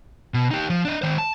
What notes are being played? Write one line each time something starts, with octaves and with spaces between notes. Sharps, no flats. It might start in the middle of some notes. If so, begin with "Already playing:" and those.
B2
D#4 G4
F3
D4 D#5
D#3 C5
A5